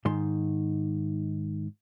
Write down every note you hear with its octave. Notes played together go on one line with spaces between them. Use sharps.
G#2 D#3 C6